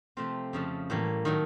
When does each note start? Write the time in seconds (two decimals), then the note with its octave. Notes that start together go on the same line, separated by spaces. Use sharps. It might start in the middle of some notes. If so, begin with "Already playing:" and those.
0.17 C3 F3 A3 C4 F4
0.53 F2 C#3 F3 A3
0.90 A2 E3 G3 A#3
1.25 D#3 F#3 A3